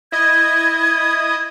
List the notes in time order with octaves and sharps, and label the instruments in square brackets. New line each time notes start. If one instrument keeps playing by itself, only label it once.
[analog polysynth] E4 D#5 [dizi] G#6